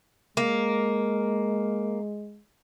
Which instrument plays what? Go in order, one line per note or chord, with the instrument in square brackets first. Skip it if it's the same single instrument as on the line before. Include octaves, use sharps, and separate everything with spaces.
[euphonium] G#3 [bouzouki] A#3